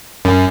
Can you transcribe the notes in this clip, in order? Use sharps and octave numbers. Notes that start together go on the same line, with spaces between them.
F#2